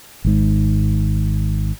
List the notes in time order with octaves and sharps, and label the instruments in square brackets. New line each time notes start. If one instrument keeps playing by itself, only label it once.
[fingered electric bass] G#1 G#2